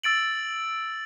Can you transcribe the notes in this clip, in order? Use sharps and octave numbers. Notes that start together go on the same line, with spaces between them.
E6 A6 D7 F#7